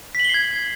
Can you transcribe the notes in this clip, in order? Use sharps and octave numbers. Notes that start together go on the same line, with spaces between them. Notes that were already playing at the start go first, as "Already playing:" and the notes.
G#6 B6 C7 F#7 G7